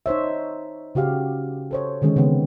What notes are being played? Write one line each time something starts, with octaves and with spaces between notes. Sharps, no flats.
D#4 C5 C#5 E5
C#3 F#4 G4 F5
A4 C5 C#5
D3 D#3 G#3 C#4
C#3 E3 B3 C4